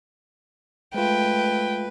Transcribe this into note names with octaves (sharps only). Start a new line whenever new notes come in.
G#3 A3 F4 B4 G5